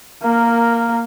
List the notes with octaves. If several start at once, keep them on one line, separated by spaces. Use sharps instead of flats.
A#3 A#4